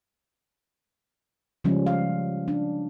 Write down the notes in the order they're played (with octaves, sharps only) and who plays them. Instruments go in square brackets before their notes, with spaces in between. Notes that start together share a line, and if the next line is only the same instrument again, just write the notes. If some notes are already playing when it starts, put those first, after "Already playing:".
[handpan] C#3 F3 G3 G#3 C#4
F5
D4